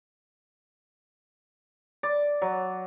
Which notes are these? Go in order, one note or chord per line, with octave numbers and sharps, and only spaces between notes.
D5
F#3